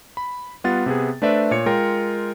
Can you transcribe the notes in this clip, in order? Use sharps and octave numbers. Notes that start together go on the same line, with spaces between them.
B5
G3 B3 F4 F#5 A6
C3 B3 G#4
A3 D4 B4 C5 D5 E5
A#2 C#5 C#7
G#3 F4 A#4 G5